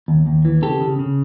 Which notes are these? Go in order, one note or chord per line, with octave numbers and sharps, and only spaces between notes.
D#2
D#2
E3
C#3 G4 A4
C#3
C#3